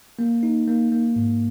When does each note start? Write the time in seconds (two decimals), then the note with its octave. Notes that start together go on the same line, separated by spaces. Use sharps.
0.19 A#3
0.43 D#4
0.68 A#3
0.92 A#3
1.16 G#2